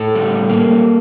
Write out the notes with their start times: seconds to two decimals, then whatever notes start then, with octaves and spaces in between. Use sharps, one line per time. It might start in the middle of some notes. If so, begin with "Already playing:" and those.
Already playing: A2 A4
0.15 G3
0.49 A#3